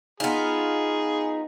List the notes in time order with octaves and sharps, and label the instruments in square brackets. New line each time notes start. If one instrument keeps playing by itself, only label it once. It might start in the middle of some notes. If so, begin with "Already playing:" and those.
[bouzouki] B3 F4 [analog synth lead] D#4 [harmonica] G#4